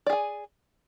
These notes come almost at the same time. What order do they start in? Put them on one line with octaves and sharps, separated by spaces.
D5 G#4 G#5